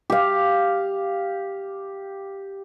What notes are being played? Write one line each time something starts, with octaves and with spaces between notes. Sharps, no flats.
G4 F5